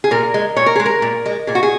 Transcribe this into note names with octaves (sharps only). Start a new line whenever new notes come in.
G#4
A#2 A#4
G#3
A#2 C#5
A#4
G#3 G#4
A#4
A#2
G#3
A#2 G#4
F#4
G#4